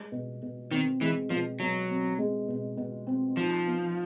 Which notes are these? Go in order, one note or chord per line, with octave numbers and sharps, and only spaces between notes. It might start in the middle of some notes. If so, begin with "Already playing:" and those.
Already playing: G#3
B2
B2
D#3 C4
E3 G#3
B2 F3
B2 F#3
C4
G#3
B2
B2
C4
F3 D#4
B3